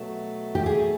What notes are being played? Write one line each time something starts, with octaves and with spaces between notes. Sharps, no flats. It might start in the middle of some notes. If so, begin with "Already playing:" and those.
Already playing: B2 F#3 A3
G4
G#4